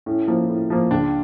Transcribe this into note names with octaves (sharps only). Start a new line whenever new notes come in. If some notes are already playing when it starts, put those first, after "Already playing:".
A2 C#4
F3 A#3
A2
F3 A#3
C#2 D4